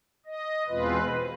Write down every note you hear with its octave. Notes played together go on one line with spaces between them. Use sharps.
D#5
E2 B2 G#3 C4 F4 B4